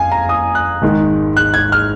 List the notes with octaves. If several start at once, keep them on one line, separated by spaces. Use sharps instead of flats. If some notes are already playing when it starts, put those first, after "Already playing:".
Already playing: F#1 F2 F5 G#5
A#5
D#6
F#6
G#1 G#2 D#3
F#6
G#6
F6